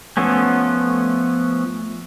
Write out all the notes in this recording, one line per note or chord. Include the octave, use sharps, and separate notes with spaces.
F3 A3 B3 C#4